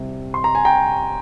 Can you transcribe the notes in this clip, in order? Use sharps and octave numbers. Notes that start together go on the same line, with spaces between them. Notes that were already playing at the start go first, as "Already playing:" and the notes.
Already playing: C2 C3 G3
C6
A#5
G#5
G5 A#5